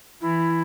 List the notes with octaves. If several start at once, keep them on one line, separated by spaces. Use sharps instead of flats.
E3 E4